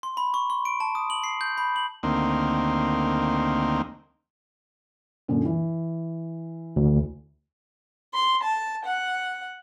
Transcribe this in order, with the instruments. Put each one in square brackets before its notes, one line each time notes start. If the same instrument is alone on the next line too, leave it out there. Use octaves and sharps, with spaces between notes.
[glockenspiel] C6
B5
C#6
C6
D7
A5
D#6
F#7
C7
G6
B5
F#7
[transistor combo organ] D2 D#3 A#3 C4
[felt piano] F#2 A#2 D3
E3
[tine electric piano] D2
[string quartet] C6
A5
F#5